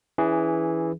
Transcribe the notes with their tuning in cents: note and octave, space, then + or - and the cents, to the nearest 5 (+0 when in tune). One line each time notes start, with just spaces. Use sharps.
E3 +0 C#4 +35 G#4 +0